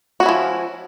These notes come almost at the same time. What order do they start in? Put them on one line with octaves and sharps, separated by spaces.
F#4 C#4 E4 F3